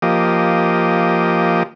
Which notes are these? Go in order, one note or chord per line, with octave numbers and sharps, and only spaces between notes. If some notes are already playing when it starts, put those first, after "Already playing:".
F3 A#3 G4 D#5